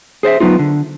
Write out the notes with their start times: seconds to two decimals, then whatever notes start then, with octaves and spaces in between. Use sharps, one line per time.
0.23 G#4 C5 D5 E5
0.40 F#3 B3 D#4 F4
0.59 D3